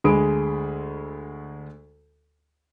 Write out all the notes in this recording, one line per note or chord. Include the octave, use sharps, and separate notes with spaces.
D2 G#3 G#4 B5 D#6 D7